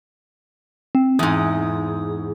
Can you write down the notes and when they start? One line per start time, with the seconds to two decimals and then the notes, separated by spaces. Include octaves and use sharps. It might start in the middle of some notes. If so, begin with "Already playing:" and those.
0.95 C4
1.19 E2 G#2 D#6